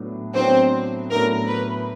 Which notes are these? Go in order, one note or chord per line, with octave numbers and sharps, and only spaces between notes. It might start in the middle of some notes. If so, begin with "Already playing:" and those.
Already playing: A2 F#3 B3 D4
A2 F#3 B3 C4 D4 C5
A2 F#3 B3 D4 A#4
B4